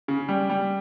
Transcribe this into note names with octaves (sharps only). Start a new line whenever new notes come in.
C#3
G3
G3